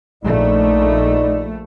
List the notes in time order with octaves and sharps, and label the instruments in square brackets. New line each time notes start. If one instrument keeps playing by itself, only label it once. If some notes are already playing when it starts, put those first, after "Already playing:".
[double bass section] A#1 A3 [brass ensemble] D#4 D5